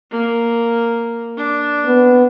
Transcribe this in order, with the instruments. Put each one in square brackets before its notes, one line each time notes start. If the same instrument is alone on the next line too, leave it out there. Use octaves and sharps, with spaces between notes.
[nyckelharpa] A#3
D4
[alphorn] B3